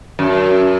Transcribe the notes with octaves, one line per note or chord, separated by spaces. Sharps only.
F#2